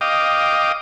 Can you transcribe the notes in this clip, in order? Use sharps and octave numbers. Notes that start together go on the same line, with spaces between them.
D#5 F5 G5 D6 D#6